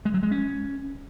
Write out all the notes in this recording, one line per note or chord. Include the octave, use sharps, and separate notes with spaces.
G#3
F#3
G#3
C#4